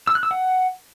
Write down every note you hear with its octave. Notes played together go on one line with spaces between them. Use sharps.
E6
F#6
E6
F#5